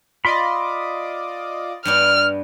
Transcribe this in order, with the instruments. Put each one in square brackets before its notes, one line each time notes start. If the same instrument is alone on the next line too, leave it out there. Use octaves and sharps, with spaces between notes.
[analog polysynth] F4 D5 D#5 [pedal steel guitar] B5 C6
[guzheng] G2 B3 D4 [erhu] F6